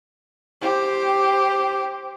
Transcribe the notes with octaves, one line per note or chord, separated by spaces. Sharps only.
G4 C5